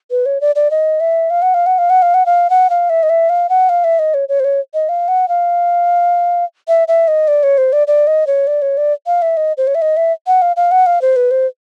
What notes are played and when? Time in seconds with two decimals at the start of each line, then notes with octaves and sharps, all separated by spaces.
0.11 B4
0.26 C#5
0.41 D5
0.56 D5
0.71 D#5
1.00 E5
1.30 F5
1.42 F#5
1.54 F5
1.66 F#5
1.78 F5
1.90 F#5
2.02 F5
2.14 F#5
2.26 F5
2.50 F#5
2.70 F5
2.90 E5
3.03 D#5
3.10 E5
3.30 F5
3.49 F#5
3.69 F5
3.84 E5
3.99 D#5
4.14 C#5
4.29 C#5
4.40 C5
4.44 C#5
4.74 D#5
4.89 F5
5.08 F#5
5.29 F5
6.68 E5
6.88 E5
7.08 D#5
7.28 D5
7.43 C#5
7.58 C5
7.73 D5
7.87 D5
8.07 D#5
8.27 C#5
8.47 D5
8.62 C#5
8.77 D5
9.07 F5
9.22 E5
9.37 D#5
9.57 C5
9.67 C#5
9.75 E5
9.82 D#5
9.97 E5
10.27 F#5
10.42 F5
10.56 F5
10.71 F#5
10.86 F5
11.02 C5
11.16 B4
11.31 C5